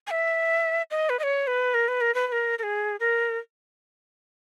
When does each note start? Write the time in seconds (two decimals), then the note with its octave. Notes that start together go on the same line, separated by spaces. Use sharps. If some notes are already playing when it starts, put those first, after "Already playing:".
0.07 G#5
0.11 E5
0.91 D#5
1.09 B4
1.19 D#5
1.23 C#5
1.47 B4
1.74 A#4
1.88 B4
2.01 A#4
2.14 B4
2.27 B4
2.32 A#4
2.59 A#4
2.63 G#4
3.00 A#4